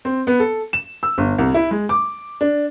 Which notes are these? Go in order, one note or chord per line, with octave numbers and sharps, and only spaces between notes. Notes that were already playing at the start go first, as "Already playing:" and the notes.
C4
B3
A4
E7
E6
G1
C2
E4
G#3
D6
D4